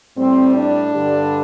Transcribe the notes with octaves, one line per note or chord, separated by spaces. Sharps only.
A2 G3 C4
D4
G2 D3 G3